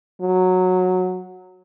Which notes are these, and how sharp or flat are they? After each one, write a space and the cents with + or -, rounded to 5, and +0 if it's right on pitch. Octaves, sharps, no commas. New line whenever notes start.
F#3 -10